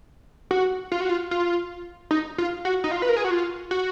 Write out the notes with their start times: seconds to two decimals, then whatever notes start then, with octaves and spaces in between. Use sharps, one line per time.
0.51 F#4
0.92 F4
1.01 F#4
1.09 F4
1.31 F4
2.11 D#4
2.38 F4
2.65 F#4
2.84 D#4
2.91 F4
3.02 B4
3.09 A#4
3.17 G#4
3.24 F#4
3.31 F4
3.71 F#4